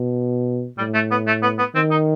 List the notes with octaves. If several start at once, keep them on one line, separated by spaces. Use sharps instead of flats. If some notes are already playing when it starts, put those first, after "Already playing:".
Already playing: B2
A2 G3
A3
B3
A3
B3
B3
D#3 C4
D#4